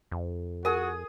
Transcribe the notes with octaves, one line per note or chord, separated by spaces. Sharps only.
F2
F#4 G#4 A#4 D#6